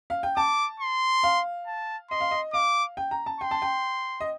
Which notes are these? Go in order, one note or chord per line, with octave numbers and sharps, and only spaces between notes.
F5
G5
A5 D6
C6
F5
A5
D#5 C6
F5
D#5
F5 D6
G5
A#5
A5
G5 C6
A5
G5
D#5